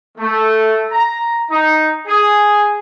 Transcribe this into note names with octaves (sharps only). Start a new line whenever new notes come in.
A3
A#5
D#4
G#4